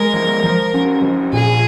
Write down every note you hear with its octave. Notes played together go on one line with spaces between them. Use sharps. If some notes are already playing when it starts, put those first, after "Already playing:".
Already playing: G#3 A#4
F3
F3
C#4
F3
A#2 G#4